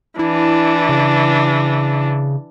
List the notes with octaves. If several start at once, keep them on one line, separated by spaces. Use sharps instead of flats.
E3 D4 E4
C#3